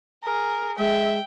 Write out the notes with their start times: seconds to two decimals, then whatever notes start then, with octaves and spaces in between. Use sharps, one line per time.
0.24 G#4 A#4
0.78 G#3 E5 G5